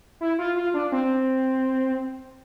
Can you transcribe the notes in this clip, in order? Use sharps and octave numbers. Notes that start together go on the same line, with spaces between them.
E4
F4
F4
D4
C4